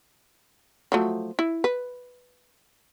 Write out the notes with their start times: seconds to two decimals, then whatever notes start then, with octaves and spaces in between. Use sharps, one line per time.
0.92 F3 F#3 A3
1.39 E4
1.64 B4